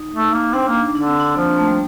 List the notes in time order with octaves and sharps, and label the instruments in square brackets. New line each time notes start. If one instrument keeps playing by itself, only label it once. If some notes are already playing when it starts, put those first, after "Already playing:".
Already playing: [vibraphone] D#4
[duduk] A3
A#3
[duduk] C4 [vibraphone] D4
[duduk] A#3
[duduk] D3 [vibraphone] D4
[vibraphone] C4
D4
[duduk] F3 [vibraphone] A#3
[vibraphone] A#3
A3
G3